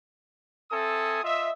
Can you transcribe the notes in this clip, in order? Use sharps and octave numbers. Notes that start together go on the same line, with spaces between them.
C4 A4 E5 G#5 D#6
F4 D#5 E5